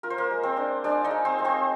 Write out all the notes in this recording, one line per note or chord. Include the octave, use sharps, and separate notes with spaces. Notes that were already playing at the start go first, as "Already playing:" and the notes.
F4 A#4
C5
A#3 A#4
G#3
C4 C5
D4
G#3 D4 D5
D#4 D#5
G#3
C4 C5
G#3
C4 C5